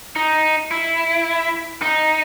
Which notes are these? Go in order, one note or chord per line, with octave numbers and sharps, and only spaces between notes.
D#4
E4
D#4